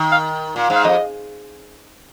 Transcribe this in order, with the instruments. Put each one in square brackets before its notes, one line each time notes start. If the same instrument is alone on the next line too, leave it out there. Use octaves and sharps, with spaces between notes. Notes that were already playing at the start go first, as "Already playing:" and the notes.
Already playing: [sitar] D#3
[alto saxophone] F5
[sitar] A#2
G#2
[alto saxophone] F5
[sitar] F2 [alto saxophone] D#5